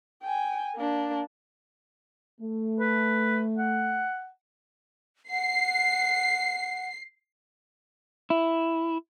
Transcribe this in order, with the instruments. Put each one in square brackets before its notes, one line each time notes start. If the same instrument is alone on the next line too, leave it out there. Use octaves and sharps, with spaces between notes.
[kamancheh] G5 G#5
A#3 D4
[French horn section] A3
[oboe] B4
F#5
[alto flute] F#5 [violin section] C7
[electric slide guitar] E4